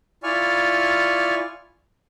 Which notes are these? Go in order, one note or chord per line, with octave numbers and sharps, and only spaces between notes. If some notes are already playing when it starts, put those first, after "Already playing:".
E4 F4 D5 G#5 C#6 F6